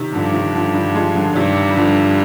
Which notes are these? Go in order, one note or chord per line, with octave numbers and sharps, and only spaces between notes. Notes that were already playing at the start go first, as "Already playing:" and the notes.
Already playing: C3 D#3
G2 D3 F3
C3 D#3
D3 F3
D#3 G3
F3 G#3
D3 F3
G2 C3 D#3
G3
D3 F3